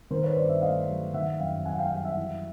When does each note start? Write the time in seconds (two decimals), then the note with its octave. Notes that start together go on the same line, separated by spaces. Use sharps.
0.10 D#3 A#4 C5
0.23 B4 C#5
0.36 G2 C5 D5
0.49 D5 E5
0.62 A3 D#5 F5
0.88 F#3
1.14 D#3 E5 F#5
1.39 F#2 F5 G5
1.65 F#2 F#5 G#5
1.78 F5 G5
1.91 G3 F5 G5
2.04 E5 F#5
2.17 E3